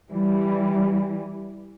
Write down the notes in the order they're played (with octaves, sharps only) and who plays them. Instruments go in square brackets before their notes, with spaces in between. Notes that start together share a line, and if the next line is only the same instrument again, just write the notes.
[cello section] E3 G3